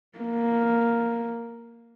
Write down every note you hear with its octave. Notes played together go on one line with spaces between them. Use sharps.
A#3